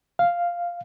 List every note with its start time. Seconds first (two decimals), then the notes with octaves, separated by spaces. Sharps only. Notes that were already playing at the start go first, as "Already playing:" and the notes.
0.19 F5